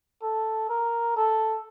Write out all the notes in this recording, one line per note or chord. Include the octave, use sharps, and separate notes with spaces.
A4
A#4
A4